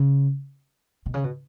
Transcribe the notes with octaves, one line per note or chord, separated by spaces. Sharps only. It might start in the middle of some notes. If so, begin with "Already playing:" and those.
Already playing: C#3
B2
C#3
B2